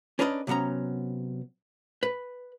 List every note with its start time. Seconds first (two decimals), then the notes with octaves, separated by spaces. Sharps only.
0.19 C#4 D4 A#4 B4 D5 D#5
0.47 C3 F#3 B3 C#4 A#5
2.03 B4